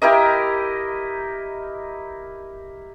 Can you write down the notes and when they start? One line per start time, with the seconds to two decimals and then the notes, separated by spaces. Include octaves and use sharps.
0.02 E4 G4 A#4 D#5